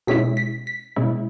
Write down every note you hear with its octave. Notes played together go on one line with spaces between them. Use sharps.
B2 G#3 C#4 E4 B6
B6
B6
B2 G#3 C#4 E4